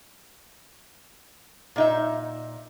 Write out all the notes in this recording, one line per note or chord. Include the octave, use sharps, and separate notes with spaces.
A#2 D#4 E5